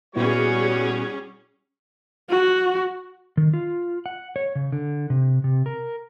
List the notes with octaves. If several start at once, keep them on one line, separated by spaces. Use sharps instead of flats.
A#2 G3 B3 C#4 E4 F#4 G#4 C#5
F#4
D#3
F4
F#5
C#5
C#3
D3
C3
C3
A#4